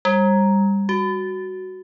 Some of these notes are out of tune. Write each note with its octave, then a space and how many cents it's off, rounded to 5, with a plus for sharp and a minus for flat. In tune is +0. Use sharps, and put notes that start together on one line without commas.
G3 +20
F#4 +5